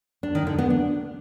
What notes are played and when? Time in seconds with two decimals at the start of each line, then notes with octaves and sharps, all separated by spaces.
0.23 D4
0.35 D#3
0.47 D3
0.58 B3
0.70 D4